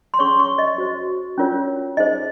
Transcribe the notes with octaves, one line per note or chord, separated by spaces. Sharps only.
C6
C#4 G#4 C#5 C#6
C#6
D#5
F#4 C5
C#4 F4 A#4 C#5
D#4 G#4 C5 D#5